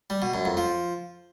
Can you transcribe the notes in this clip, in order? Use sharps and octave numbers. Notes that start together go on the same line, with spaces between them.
G3
B2
F#2
F2
F3